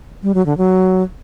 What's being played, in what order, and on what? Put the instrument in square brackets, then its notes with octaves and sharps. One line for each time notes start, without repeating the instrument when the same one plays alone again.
[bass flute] G3
F#3
D3
F#3